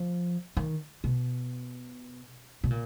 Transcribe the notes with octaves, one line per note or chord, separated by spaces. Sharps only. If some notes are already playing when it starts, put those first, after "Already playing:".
Already playing: F3
D#3
B2
B2
A#2